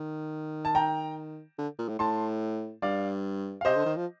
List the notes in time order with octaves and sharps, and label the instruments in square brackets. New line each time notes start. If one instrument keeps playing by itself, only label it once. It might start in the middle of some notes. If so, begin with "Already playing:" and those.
Already playing: [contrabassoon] D#3
[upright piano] A5
G5 A#5
[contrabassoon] D3
A#2
A2
[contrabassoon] A2 [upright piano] A5 C6
[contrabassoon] G2 [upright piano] D5 F5
[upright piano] F5
[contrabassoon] C3 [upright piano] C5 D#5
[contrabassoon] D3
D#3
F3